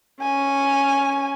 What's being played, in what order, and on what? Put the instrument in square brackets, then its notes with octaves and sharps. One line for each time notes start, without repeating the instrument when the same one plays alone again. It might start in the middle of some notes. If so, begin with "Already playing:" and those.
[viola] C#4 [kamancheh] G#5